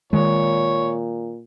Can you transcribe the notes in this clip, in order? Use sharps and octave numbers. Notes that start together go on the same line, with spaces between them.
A#2 D#3 G#3 C#5